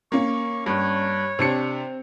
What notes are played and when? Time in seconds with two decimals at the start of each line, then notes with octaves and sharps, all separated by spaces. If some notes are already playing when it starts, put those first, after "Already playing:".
0.12 A#3 C#4 C#6
0.66 G2 C#5
1.39 C3 C4 D4 C#7